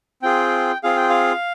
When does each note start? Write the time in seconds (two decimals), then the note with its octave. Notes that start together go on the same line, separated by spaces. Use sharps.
0.22 C4 F4 G#4 G5
0.83 C4 F4 G#4 F5
0.96 G5
1.10 F5